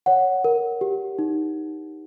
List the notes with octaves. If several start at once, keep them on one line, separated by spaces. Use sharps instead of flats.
C#5 F#5
A#4
G4
D#4